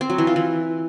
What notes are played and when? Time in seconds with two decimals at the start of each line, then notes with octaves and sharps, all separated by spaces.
0.01 C4
0.10 F#3
0.18 E3
0.27 F4
0.36 E3